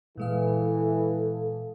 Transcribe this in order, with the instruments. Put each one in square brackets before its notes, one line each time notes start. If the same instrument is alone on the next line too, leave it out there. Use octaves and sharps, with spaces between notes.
[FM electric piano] A#2 G#3 F5 [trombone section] E3 [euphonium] A4